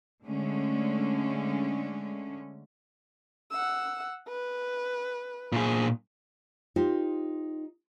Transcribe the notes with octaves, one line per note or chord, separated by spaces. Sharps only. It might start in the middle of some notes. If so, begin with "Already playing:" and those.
D3 G#3 A3 C#4
F#5 E6
B4
A#2 G#4
D#4 F4 G4 C5